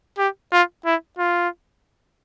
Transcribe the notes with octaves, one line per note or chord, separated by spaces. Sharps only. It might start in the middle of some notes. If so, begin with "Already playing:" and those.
G4
F4
E4
F4